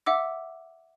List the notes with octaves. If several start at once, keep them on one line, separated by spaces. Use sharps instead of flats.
E5 F#5 D6 E6